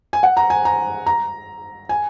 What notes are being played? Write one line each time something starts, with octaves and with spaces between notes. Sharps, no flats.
G#5
F#5
A#5
G#5
A#5
A#5
G#5